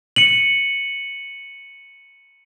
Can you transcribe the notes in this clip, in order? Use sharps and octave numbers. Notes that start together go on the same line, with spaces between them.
C#7 D#7 F#7